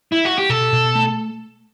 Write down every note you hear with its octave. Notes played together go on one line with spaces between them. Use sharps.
E4
F#4
G4
B2 A4
B2
A3